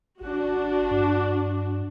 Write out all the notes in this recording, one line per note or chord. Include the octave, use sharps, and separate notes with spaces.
G#1 D4 F#4
G2